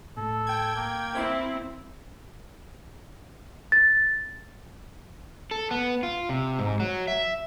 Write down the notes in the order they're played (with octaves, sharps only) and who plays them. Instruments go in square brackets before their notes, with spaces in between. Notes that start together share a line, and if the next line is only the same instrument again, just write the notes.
[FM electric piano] A2 [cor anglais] A4
[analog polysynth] G5 G#6
[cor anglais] A#3
[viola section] C4 E4 [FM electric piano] C5 E5 C7
[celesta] A6
[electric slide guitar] A4
B3
F4
C3
G#2
F#3
E5